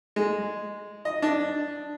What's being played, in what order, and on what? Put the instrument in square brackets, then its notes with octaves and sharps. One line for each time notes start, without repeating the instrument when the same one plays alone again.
[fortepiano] G#3
D#5
D4